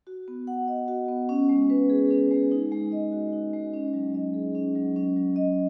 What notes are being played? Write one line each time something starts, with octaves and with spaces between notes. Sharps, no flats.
F#4
B3
F#5
D#5
F#4
B3
C#4
G#3
B4
G#4
C#4
G#3
D#4
G#3
D#5
F#4
D#4
G#3
C#4
F#3
D#5
G#4
C#4
F#3
C#4
F#3
D#5